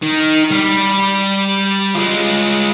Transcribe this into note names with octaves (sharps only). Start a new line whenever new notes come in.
D#3
G3
G#3 F4